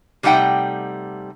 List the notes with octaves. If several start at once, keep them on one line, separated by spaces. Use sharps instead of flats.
C3 G3 A3 D#4 F#5 G5